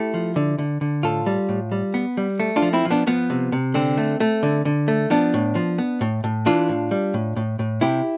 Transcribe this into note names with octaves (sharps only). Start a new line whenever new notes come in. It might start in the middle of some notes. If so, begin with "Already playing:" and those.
Already playing: A3 E4 G4
F3
D3
D3
D3
A2 F4 A4
G3
A2
G3
B3
G3
A3
D4 F4
F3
C4 E4
F3
B3 D4
F3 B3
C3
C3
D3 C4
A3
A3
D3
D3
A3
F3 B3 D4
A2
F3
B3
A2
A2
E3 D4 F4
A2
G3
A2
A2
A2
C3 E4 G4